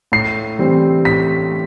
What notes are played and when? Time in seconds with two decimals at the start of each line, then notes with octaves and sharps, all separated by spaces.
0.12 A2 C7
0.59 E3 G3 C4
1.05 A2 B6